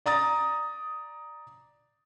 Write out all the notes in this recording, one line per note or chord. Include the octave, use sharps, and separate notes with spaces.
D5 A#5 D#6 A6